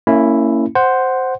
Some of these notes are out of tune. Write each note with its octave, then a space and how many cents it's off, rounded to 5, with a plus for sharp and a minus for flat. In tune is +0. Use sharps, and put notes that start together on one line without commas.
A#3 -30 C#4 +0 E4 +0
C5 +0 F#5 +5